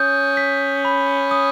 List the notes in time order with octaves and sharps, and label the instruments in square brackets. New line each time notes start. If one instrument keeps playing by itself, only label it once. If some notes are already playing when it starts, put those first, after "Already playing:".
Already playing: [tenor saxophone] C#4 [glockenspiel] D#6 G6
[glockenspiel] B6
B5
D#6